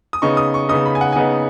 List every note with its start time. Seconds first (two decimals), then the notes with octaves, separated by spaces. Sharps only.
0.13 D#6
0.22 C#3 B3 D#4 C#6
0.37 D#6
0.54 C#6
0.69 C#3 B3 D#4 D#6
0.86 B5
0.95 G#5
1.01 F#5
1.12 G#5
1.16 C#3 B3 D#4 F#5